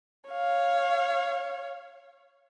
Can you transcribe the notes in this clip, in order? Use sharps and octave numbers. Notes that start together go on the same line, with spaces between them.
C#5 F5